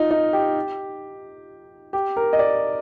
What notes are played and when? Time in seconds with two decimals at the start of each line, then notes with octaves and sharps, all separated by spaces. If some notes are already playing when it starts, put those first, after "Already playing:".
Already playing: D#4 F4
0.11 D#4
0.33 G4
1.93 G4
2.17 A#4
2.33 D#5
2.39 D5